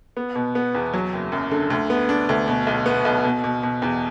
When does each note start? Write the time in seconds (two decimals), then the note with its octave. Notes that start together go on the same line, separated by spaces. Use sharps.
0.17 B3
0.35 B2
0.55 B3
0.75 E2
0.94 F#3
1.13 F#1
1.32 F#2
1.51 D3
1.70 D2
1.90 B3
2.09 D4
2.29 D2
2.48 B2
2.67 B1
2.86 B3
3.05 B1
3.25 B2
3.44 B2
3.63 B2
3.82 E2